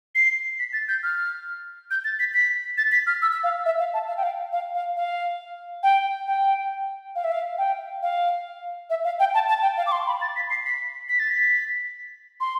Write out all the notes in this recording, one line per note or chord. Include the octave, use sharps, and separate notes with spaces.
C7
B6
A6
G6
F6
G6
A6
B6
B6
A6
B6
F6
E6
E6
F5
E5
F5
A5
F5
G5
F5
F5
F5
F5
G5
G5
F5
E5
F5
G5
F5
E5
F5
G5
A5
A5
G5
F5
D6
C6
B5
A6
B6
C7
B6
B6
A6
B6
C6